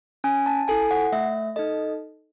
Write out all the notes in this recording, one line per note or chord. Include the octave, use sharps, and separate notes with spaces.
C#4 G#5
A5
E4 A4 G#5
F#5
A3 E5
D#4 A4 D#5